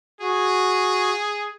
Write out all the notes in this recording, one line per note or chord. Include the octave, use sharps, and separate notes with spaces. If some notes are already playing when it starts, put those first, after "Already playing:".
F#4 G#4